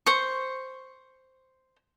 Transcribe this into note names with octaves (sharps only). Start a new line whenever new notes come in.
C5 C#6